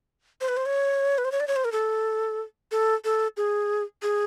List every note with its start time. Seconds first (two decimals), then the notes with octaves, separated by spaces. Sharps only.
0.41 C5
0.48 B4
0.57 C5
0.66 C#5
1.18 B4
1.25 C5
1.32 C#5
1.40 D5
1.48 C#5
1.56 C5
1.65 A#4
1.72 A4
2.71 A4
3.05 A4
3.37 G#4
4.02 G#4